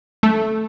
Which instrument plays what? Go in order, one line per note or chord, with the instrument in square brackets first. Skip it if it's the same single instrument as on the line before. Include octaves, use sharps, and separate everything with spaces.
[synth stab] A3